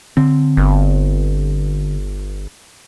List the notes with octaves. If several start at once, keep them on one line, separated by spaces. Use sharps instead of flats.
D3 C4
G1